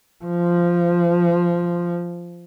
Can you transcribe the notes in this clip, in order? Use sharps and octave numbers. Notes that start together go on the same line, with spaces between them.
F3